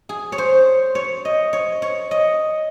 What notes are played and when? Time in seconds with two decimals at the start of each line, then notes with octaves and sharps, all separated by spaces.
0.09 G#4
0.32 C#5
0.38 C5
0.95 C#5
1.25 D#5
1.53 C#5
1.82 C#5
2.11 D#5